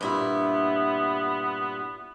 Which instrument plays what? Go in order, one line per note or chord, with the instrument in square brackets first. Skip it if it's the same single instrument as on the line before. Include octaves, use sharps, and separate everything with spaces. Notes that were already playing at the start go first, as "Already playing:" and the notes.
[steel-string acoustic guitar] G2 A#2 E4 [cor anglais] B3